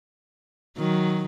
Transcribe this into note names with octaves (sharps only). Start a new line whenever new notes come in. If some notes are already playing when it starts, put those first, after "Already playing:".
D#3 F#3